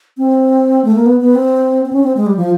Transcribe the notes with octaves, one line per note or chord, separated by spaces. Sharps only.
C4
A3
A#3
B3
B3
C4
C4
C#4
C4
G#3
G3
F3